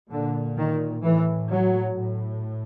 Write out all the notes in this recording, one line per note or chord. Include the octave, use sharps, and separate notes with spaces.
A#2 D3
D#3
A2 E3
F#3
A2